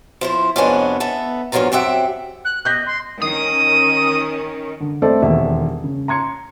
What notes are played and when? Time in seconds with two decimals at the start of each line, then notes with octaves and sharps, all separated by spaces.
0.21 F3 E4 C5
0.56 F2 C3 G#3 B3 C#4 D4
1.00 B3 A4 E5
1.52 E2 G2 F3 F#3 F4 A#5
1.72 F#2 C4 G4 E5 F#5
2.44 F#6
2.65 D#5 F#6 G6 B6
2.86 C6
3.22 D#3 C#4 D#6
4.80 D3
5.02 A3 C4 A4 C5 D5
5.22 E1 D#2 E5
5.84 C#3
6.08 A#5 C6 G#6 C#7